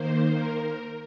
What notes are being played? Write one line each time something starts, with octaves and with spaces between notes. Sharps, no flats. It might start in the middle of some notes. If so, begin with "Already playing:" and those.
Already playing: D#3 A#3 C5
A#4